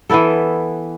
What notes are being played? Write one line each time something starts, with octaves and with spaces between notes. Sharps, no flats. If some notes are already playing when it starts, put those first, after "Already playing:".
E3 B3 E4 A4